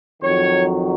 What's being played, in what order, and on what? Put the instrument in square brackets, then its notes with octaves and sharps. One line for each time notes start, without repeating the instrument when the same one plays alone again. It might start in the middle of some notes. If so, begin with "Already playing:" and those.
[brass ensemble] F2 D#3 F#3 C#5